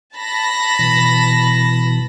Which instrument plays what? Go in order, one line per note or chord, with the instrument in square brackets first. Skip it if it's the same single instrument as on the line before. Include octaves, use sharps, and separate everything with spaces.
[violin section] A5 B5 A#6
[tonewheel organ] B2 E3